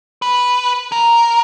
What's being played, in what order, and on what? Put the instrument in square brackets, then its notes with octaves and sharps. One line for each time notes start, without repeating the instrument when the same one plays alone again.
[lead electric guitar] B4
A#4